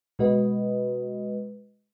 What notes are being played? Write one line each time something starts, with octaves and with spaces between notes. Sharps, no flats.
B2 G#3 F#4 B4 D#5